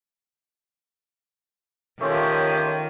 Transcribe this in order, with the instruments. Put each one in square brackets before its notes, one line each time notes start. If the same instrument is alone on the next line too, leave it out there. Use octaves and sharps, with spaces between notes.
[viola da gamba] D#3 [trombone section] F3 G4 [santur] A3 C#4 F4 [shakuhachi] C#5